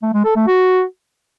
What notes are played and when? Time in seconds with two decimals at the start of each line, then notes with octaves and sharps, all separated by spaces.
0.03 A3
0.14 G#3
0.25 A4
0.36 A3
0.47 F#4